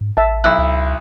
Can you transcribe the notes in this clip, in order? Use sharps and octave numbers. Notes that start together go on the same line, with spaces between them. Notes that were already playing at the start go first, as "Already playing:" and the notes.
G#2
A1 E5 A5
B1 E4 E6 F#6
C#2